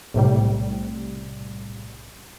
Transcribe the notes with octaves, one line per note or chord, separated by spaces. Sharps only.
B1 A2 C3 G3